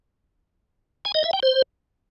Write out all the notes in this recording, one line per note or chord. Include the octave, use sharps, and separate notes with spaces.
G#5
D#5
E5
G5
C5